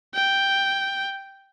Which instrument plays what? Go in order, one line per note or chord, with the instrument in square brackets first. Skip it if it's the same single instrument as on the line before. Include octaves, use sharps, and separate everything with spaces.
[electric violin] G5